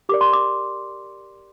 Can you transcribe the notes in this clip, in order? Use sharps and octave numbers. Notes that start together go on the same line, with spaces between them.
G4 A#4 D5 D6
C6
D6